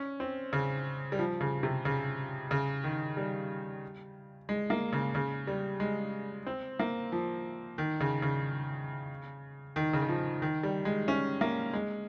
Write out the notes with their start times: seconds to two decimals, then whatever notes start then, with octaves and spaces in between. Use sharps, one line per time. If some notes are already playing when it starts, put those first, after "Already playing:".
Already playing: C#4
0.20 C4
0.53 C#3
1.12 G3
1.19 F3
1.41 C#3
1.63 C3
1.85 C#3
2.51 C#3
2.84 D#3
3.17 G3
4.49 G#3
4.70 A#3
4.93 C#3
5.15 C#3
5.47 G3
5.80 G#3
6.47 C4
6.79 A#3
7.12 F3
7.78 D#3
8.00 C#3
8.22 C#3
9.76 D#3
9.93 C#3
10.01 D#3
10.09 F3
10.42 D#3
10.63 G3
10.85 G#3
11.08 C#4
11.41 A#3
11.73 G#3